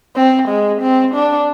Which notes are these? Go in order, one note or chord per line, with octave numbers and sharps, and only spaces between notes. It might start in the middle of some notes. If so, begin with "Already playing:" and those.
C4
G#3
C4
D4